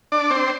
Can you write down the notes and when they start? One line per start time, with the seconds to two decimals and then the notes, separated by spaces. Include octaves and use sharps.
0.12 D4 D5
0.30 C4 C5